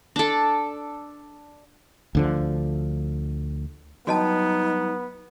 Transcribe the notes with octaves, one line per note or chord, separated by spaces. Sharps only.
D4 A4
D2 D3 F3
G2 F#3 B3 D#4 F#4 D#5 G5 A5